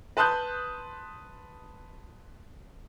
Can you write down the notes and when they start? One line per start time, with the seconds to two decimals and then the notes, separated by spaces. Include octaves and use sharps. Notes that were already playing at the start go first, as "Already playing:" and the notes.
0.17 B4 A5 C6 D#6 F#6 G6